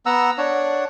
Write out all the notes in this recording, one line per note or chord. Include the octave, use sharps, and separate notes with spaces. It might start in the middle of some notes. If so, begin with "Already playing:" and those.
B3 F#5 A#5 E6
D4 C#5 F#5